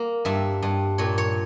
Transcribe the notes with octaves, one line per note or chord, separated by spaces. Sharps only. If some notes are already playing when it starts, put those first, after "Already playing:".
Already playing: A#3
G2 E5
G2
A#2 C#5
C#5